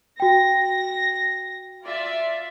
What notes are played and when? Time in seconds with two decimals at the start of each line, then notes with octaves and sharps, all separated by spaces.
0.20 F#4 G5 A#6
1.84 F4 D5 E5